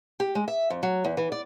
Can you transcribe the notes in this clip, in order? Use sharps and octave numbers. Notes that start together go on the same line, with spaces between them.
G4
G#3
E5
F2
F#3
E2
E3
D5